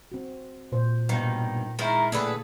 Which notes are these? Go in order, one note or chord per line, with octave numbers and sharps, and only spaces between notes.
C4 F#4
A#2 C5
G2 B2 D#3 A#3
D#3 G#3 E4 A#4
A2 D3 A#3 D4 G#4 A4 B4